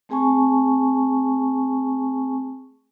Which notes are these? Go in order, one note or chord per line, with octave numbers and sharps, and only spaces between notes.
A3 C4 G#4 G#5 A5 C#6